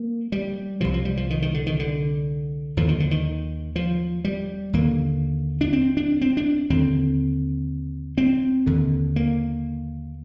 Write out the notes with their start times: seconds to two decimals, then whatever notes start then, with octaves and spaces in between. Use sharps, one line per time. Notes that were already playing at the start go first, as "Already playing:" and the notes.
Already playing: A#3
0.32 G3
0.81 C2 C3 F3
0.94 F3
1.05 G3
1.17 F3
1.30 D#3
1.42 D#3
1.54 D3
1.66 D#3
1.79 D3
2.77 D#2 D3 F3
2.89 D#3
3.00 D3
3.11 D#3
3.76 F3
4.25 G3
4.73 D#2 D3 A#3
5.61 D4
5.73 C4
5.97 D4
6.21 C4
6.37 D4
6.70 D#2 D3 C4
8.18 C4
8.66 D#2 D3
9.16 A#3